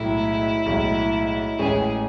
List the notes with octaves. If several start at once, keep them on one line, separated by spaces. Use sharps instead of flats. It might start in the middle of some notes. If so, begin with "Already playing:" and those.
Already playing: B1 A2 G#3 E4
B1 A2 G#3
A1 A2 G#3 C#4 G#4